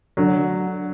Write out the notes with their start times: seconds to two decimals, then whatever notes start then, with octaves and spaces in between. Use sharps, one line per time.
0.17 D3 F#3